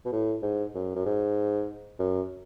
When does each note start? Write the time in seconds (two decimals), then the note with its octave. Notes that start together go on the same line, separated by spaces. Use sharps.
0.05 B2
0.12 A2
0.43 G#2
0.75 F#2
0.95 F#2
1.05 G#2
1.99 F#2